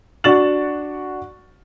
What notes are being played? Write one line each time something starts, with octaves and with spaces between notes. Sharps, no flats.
D4 F#4 C#6 A6 E7 F#7